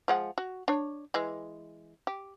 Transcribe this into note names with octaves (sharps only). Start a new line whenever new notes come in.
F3 G#3 F#5
F#4
D4 C#5
E3 G#3
G4